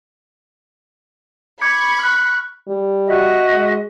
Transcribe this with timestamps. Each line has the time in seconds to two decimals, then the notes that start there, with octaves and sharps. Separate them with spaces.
1.61 B5 C#6 D6 G#6 C#7
1.99 F6 F#6
2.68 G3
3.07 F#4 D#5 E5
3.53 G#3